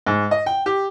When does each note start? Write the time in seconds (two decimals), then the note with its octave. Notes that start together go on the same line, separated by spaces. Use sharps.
0.07 G#2
0.31 D#5
0.46 G5
0.66 G4